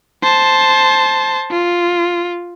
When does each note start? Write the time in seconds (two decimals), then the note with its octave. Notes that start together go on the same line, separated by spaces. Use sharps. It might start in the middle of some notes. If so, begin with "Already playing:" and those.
0.23 C5 A5
1.51 F4